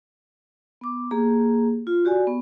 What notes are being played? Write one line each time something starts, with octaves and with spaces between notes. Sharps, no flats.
B3 D6
A#3 G4 G#4
F4
F#4 G4 D5 G#5
B3